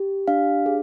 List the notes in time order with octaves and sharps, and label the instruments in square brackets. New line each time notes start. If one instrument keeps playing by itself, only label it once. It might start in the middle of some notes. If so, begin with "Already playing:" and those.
Already playing: [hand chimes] G4
D4 F5
G#4